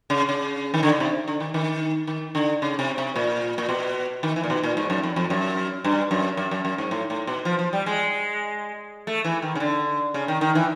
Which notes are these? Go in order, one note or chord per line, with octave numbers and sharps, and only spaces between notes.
C#3
C#3
D#3
D3
C#3
C3
D3
D#3
D#3
D#3
D3
C#3
C3
C3
A#2
A#2
B2
D#3
E3
A#2
B2
A#2
G#2
F#2
F2
F2
F#2
G2
F#2
F#2
F#2
F#2
G#2
A2
A2
B2
F3
F3
G3
G#3
A3
E3
D#3
C#3
D3
C#3
D#3
D#3
E3